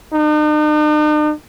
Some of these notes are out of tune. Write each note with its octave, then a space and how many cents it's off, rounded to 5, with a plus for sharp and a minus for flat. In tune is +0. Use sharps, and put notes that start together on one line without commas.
D#4 -45